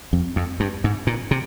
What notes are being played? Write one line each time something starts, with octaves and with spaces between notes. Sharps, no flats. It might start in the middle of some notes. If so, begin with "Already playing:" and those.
F2
F2
G2
G#2
A#2
C3